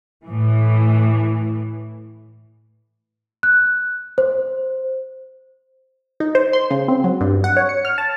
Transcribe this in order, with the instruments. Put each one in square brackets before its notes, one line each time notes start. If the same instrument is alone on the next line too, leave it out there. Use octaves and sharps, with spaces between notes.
[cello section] A2 E3
[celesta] F#6
C5
[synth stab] D#4
C5
C6
C#3
C4
F#3
G2
F#5
C#5
C#7
F6
A5